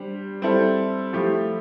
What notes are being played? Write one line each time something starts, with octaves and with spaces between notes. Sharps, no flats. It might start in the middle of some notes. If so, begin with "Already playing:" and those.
Already playing: G3 D4 G4 C5
G3 C4 E4 A4
F3 A3 E4 G4